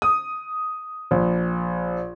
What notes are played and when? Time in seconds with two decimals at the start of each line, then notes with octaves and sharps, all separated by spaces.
0.02 D#6
1.11 A#1